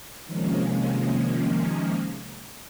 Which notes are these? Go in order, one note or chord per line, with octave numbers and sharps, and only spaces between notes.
C3 D#3 F3 G#3 A#3 C#4